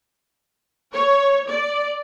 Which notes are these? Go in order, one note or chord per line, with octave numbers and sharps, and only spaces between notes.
C#5
D5